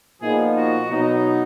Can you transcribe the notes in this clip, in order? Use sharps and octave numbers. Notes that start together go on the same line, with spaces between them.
A#2 F3 B3 D#4 G#4
F#4
B2 F#3 B3 D#4